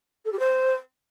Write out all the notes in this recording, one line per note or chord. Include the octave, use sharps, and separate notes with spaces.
A4
G4
C5